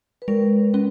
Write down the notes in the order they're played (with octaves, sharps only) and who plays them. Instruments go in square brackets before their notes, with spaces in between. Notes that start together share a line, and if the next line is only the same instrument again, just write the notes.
[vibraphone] B4
[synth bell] G#3 [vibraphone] A#4
[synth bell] C#4 [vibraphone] B4